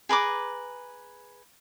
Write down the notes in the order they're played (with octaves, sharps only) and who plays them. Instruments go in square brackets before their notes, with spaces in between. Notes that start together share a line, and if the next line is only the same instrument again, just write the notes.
[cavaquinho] G#4 B4 A#5 D6